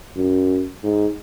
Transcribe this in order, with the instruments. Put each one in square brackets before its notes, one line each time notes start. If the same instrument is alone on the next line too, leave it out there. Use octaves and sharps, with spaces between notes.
[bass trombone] F#2
G#2